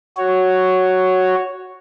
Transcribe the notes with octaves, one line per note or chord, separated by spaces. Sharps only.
F#4 C#5